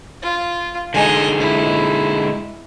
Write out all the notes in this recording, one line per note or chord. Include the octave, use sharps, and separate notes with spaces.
F4
D3 G#3 D#4 D#5 G#5
E4